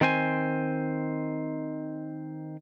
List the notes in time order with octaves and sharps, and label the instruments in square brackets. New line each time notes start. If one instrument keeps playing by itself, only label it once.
[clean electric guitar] D#3 C4 C5 G#5